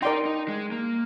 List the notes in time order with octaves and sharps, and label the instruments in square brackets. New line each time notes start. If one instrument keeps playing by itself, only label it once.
[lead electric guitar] D#4 [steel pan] A#4 D5 G5 C6
[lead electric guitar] D#4
G#3
A#3